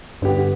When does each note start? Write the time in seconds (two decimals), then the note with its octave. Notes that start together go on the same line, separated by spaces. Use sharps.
0.22 G2 D3 B3 G4